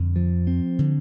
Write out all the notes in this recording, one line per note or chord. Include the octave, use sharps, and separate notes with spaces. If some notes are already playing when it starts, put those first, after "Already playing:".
Already playing: F2 D3
F3
C4
D3